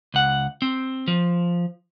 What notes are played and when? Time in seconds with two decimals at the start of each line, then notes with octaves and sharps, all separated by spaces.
0.14 C#2 F#5
0.62 C4
1.08 F3